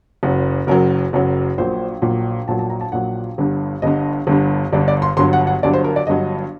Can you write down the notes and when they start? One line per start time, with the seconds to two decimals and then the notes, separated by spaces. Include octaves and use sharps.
0.23 F#1 F#2 F#3
0.67 F#1 F#2 F#3 A#4
1.13 F#1 F#2 F#3
1.58 A#1 A#2 F#3 C5
2.02 A#1 A#2 F#3
2.48 A#1 A#2 F#3 A5
2.59 A5
2.70 A#5
2.81 A5
2.92 A#1 A#2 F#3 F#5
3.38 G1 G2 D3
3.82 G1 G2 D3 D#5
4.27 G1 G2 D3
4.72 G1 G2 D3 D5
4.88 D5
5.02 C6
5.17 G1 G2 F#3 C6
5.33 F#5
5.47 F#5
5.63 G1 G2 F#3 D5
5.73 C5
5.84 A#4
5.96 D5
6.07 G1 G2 F#3 D#5